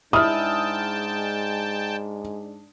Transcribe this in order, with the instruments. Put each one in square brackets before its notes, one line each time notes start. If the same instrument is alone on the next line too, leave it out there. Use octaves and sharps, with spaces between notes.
[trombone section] G#2 G#3 D4 [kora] E4 [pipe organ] G5 A5 [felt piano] D#6 F6